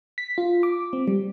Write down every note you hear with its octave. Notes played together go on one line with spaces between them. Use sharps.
B6
F4
D6
C4
G3